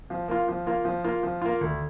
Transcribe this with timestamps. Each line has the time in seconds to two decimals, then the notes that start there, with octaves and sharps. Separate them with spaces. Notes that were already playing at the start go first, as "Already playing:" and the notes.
0.10 F3
0.28 A#3 F4
0.48 F3
0.66 A#3 F4
0.85 F3
1.04 A#3 F4
1.23 F3
1.42 A#3 F4
1.61 D2